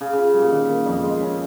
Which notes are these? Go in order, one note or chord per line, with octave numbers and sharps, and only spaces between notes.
C#3 C#4
C#3 F4
A#2 G3
D#3
A#3
F2
G#3
C#4